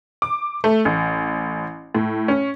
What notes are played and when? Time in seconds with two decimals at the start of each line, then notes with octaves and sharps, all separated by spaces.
0.22 D6
0.64 A3
0.85 A1
1.95 A2
2.28 C#4